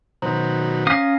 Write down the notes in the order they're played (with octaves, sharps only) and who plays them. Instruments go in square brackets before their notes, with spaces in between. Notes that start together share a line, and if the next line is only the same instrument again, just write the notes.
[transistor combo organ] B2 D#3 F#3 [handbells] C5 [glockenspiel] A#5
[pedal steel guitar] C#4 F5 D#6 [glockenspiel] A#6